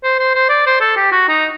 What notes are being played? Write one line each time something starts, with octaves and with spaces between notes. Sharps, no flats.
C5
C5
C5
D5
C5
A4
G4
F#4
D#4